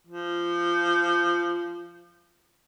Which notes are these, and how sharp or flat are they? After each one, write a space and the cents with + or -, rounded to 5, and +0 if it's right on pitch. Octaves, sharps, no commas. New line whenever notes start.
F3 -20